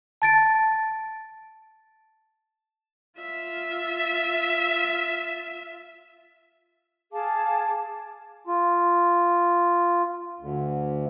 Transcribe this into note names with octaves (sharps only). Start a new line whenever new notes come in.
A5 A6 D7
F4 E5
G#4 F5 A5 D6
F4
D2